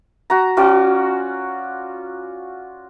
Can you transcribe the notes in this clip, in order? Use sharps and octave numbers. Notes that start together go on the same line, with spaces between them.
F#4 A#5
C#4 F4 F#4 D5